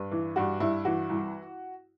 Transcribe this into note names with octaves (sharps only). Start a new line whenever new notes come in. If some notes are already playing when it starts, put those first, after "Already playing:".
Already playing: G2 B4
E3
G2 F#4
G2 E4
E3 F#4
C2